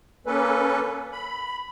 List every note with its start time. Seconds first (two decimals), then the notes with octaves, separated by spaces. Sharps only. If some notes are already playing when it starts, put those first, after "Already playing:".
0.26 A#3 C#4 A4 B4
1.12 B5